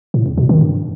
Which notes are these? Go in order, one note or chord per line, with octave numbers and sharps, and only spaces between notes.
A2
E2
B2
D#3
G2